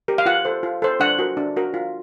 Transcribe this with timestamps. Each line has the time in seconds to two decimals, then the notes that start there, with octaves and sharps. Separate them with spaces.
0.08 G4 A#4
0.18 F5
0.26 F4 F#5
0.45 A4 C5
0.63 F4
0.82 A4 C5
1.00 D4 F#5
1.19 F#4 A#4
1.37 D4
1.57 F#4 A#4
1.74 F4